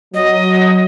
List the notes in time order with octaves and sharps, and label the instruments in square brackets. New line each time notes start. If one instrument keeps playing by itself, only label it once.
[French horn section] F#3 [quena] D#5